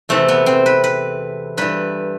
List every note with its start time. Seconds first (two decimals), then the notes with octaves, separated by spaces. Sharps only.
0.09 E2 C3 E3 A3
0.28 B3
0.46 C4
0.66 B4
0.84 B4
1.57 G2 E3 B4